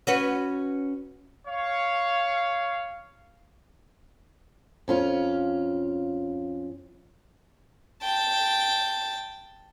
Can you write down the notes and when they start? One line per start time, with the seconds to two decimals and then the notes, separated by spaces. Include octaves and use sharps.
0.07 C#4 F#4 B4
1.47 C#5 F5
4.88 F2 C#4 F4
8.02 G5 A5